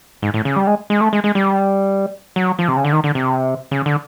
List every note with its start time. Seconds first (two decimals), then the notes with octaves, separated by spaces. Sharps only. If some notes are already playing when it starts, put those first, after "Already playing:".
0.22 G#2
0.34 A2
0.45 C#3
0.56 G3
0.67 G#3
0.90 G#3
1.01 A3
1.13 G#3
1.24 G#3
1.35 G3
2.36 F#3
2.59 F3
2.68 C3
2.77 C#3
2.85 D3
2.92 D#3
3.04 D3
3.15 C3
3.71 C#3
3.86 D3